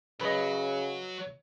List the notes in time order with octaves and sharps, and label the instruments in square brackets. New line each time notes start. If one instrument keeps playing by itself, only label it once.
[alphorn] C#3 [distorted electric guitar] F#3 [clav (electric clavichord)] B4 C#5 D#5